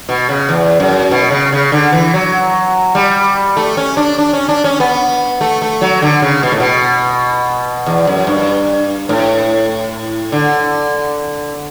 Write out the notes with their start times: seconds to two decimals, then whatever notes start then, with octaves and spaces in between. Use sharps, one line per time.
0.09 B2
0.29 C#3
0.49 E2
0.80 F#2
1.11 B2
1.31 C#3
1.52 C#3
1.72 D3
1.92 E3
2.14 F#3
2.95 G3
3.57 A3
3.77 C#4
3.97 D4
4.18 D4
4.33 C#4
4.49 D4
4.64 C#4
4.80 B3
5.41 A3
5.62 A3
5.81 F#3
6.02 D3
6.22 C#3
6.43 B2
6.52 A2
6.60 B2
7.86 E2
8.07 F#2
8.27 G2
9.09 A2
10.32 D3